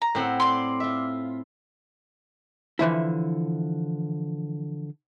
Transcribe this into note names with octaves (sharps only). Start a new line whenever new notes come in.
A#5
A2 C4 F#5
D5 C6
F4 E5
D3 E3 F3 E4